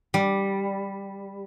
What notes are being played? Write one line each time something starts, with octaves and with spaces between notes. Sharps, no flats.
G3